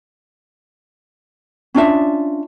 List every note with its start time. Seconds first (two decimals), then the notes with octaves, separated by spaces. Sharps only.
1.75 C#4 D4 F4 E5